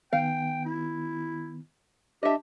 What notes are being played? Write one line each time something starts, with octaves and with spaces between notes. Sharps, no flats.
D#3 B3 F5 G5
E4
D4 G4 D#5 E5 A5